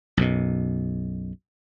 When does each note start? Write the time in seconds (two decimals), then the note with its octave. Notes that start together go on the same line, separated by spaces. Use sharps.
0.17 B1 F#2 B2